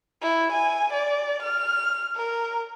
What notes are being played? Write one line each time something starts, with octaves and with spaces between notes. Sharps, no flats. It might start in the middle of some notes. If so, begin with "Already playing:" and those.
E4
G#5
D5
F6
A#4